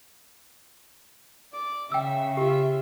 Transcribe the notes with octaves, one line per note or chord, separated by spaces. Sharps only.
D5 D6
C#3 E5 G5 E6
F4 G4 E5